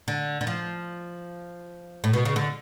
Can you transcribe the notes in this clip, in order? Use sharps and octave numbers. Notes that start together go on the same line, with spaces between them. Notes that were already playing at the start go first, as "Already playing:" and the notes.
D3
D3
F3
A2
B2
C#3
D3